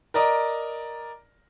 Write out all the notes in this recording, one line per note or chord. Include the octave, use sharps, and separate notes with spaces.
A#4 D5 D#5 A#5